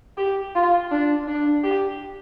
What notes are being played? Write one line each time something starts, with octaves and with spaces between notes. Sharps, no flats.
G4
F4
D4
D4
G4